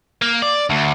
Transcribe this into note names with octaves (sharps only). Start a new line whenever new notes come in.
A#3
D5
D2